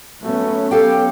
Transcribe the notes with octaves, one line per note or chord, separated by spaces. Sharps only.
F#3 A3 B3 C#4
G4 A4 F5 G5